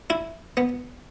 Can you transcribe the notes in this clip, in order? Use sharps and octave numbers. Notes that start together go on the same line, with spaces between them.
E4
B3